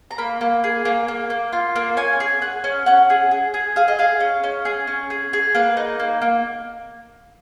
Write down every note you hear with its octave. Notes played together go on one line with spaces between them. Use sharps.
A#5
A#3 B5
A#3
G#4
A#3
A#3
A#3
F4
A#3
C#4 G#5
G#4
G#4 F#5
C#4
C#4 F#5
G#4
G#4
G#4
G#4 F5
D#5
G#4 F5
C#4
C#4
G#4
C#4
G#4
G#4
A#3 B4
D#4
A#3
A#3